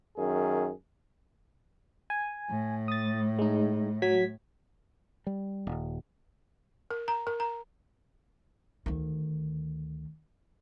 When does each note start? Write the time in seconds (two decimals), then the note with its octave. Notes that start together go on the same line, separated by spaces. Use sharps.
0.17 F#2 D#3 G#4
2.10 G#5
2.50 A2
2.88 D#6 A6
3.39 G#3 D#4
4.02 F#3 G#6 B6
5.27 G3
5.67 D#1
6.91 A#4
7.08 A#5
7.27 A#4
7.40 A#5
8.86 D2 D#3